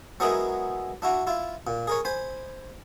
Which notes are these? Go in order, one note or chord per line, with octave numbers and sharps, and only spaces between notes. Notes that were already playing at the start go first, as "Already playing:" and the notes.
F#3 G#3 B3 E4 G#4 A#4
D4 E4 F#4
E4 F4
A#2
G#4 A#4 C#5
C5 G#5 B5